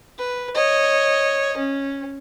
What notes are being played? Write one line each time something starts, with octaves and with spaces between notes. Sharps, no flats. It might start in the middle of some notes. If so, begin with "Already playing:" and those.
B4
C#5 D#5
C#4